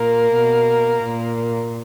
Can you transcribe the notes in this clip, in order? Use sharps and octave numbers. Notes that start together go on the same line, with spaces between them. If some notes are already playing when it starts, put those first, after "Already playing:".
Already playing: A#2 A#3 A#4
B2
A#2